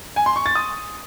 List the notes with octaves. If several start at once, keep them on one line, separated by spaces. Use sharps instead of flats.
G#5
C6
C#6
A6
D#6